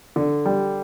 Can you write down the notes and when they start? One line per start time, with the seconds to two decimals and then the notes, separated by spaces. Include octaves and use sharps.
0.16 D3
0.46 G3